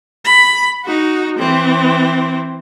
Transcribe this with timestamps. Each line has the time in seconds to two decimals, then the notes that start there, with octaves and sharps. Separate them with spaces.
0.25 B5
0.85 D#4 F#4
1.38 E3 C4